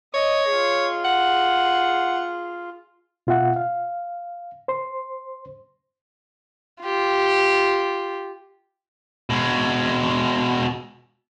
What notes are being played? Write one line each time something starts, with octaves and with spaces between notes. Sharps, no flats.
C#5 D#5
F4 G#4
F#5
B2 F4 E5 F#5
F5
C5 C6
F4 G4
B2 G#3